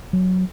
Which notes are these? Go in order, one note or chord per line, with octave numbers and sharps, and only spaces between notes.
F#3